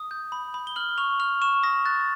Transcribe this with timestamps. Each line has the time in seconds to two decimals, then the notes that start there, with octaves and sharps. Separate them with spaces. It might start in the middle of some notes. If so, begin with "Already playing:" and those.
Already playing: D#6
0.11 G6
0.32 B5
0.54 B5
0.67 G7
0.76 F6 F#7
0.98 C#6 F7
1.20 F6 F7
1.42 C#6 E7
1.63 D#6 A#6
1.85 F#6 A6